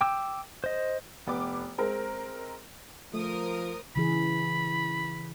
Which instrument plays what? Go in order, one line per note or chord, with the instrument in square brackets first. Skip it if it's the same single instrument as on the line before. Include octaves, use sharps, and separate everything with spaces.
[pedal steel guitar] G5 D6 E6
C5 D#5
[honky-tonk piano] F1 B3 G5 D6
G#3 C4 A#4
[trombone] F3 [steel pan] A3 [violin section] A#4 C5 D#6
[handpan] C#3 E3 G#4 [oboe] B5